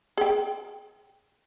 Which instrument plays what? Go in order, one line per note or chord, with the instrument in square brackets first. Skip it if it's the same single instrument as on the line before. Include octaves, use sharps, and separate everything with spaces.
[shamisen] G#4 G5